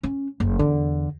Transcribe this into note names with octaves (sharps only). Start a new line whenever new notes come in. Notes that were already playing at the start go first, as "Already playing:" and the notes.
C#4
F#1
E2 D3